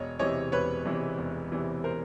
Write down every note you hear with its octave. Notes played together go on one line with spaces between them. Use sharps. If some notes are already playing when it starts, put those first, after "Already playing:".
Already playing: E1 C#5 D#5
E2 C3 E3 C#5 D#5
E1 B4 C#5
E2 C3 E3
E1
E2 C3 E3
A#4 C5